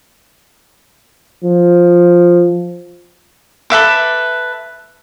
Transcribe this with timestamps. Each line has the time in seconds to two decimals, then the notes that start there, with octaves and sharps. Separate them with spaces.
1.44 F3
3.70 A4 B4 E5 D6